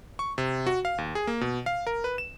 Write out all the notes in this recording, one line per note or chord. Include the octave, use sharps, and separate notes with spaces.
C#6
C3
F#4
F5
D#2
G#4
A#3
B2
F5
A#4
B4
E7